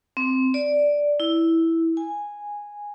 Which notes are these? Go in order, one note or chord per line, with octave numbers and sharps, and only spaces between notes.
C4
D5
E4
G#5